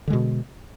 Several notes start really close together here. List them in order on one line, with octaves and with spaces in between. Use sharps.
D3 G#3 B2